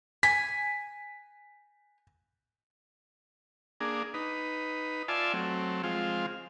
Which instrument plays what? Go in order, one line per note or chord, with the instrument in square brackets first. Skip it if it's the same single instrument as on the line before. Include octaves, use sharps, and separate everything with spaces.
[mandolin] G#5 [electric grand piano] B6
[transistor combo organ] A#3 D4 G#4
D#4 B4
F4 D5 E5 G#5 A5 C6
F#3 A3 C4
F3 G#3 C4 F4